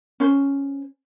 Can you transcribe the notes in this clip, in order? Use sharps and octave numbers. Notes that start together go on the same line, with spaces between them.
C#4 C5